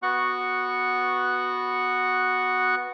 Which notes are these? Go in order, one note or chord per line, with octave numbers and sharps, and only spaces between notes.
B3 F#4 F#5 C#6 F#6